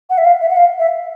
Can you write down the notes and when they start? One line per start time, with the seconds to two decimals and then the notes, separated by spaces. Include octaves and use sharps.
0.09 F#5
0.17 E5
0.24 F5
0.41 E5
0.50 F#5
0.56 F5
0.79 E5